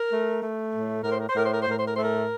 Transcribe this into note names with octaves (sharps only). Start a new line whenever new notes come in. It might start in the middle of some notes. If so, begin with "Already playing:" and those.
Already playing: A#4
A3
A3
A2
A2 A#4
C5
A#4
C5
A2 A#4
C5
A#4
A2 C5
A#4
C5
A#4
A3 C5
A#4